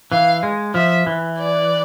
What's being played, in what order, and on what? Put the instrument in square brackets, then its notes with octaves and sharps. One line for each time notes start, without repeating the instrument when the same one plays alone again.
[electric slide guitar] E3 [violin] F5
[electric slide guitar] G#3
[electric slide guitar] F3 [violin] E5
[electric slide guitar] E3
[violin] D5